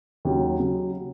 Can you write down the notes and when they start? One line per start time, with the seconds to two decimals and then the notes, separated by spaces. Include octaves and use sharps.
0.25 D#2 C#3 F#3
0.59 C#3 F#3